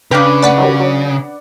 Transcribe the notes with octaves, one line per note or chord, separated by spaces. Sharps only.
C#3 D4 B4 F5 G5 A#5
D5 F#5 D6 A6 B6 C#7
D#3 F#3 G3
F#3